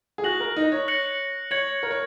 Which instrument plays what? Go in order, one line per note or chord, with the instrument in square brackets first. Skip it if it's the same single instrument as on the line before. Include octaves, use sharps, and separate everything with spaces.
[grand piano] G#4
[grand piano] F#4 [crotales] F#6 A#6 F#7
[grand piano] A#4
D#4
C#5
[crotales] F#6 A#6 C#7 F#7
[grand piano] C#5 [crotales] G#6 C#7 F#7
[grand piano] A#4
C#5